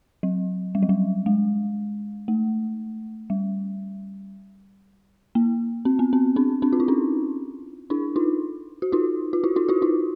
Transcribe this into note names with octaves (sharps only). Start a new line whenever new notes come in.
F#3
G3
F#3
G3
G#3
A3
G3
A#3
C4
B3
C4
C4 D4
C4 D4
F4
E4
C#4 D#4
D4 E4
D#4 F4
F#4
D#4 F4
F4
E4 F#4
D#4 F4
E4 F#4
D#4 F4